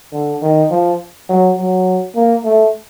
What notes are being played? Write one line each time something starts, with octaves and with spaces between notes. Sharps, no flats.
D3
D#3
F3
F#3
F#3
A#3
A3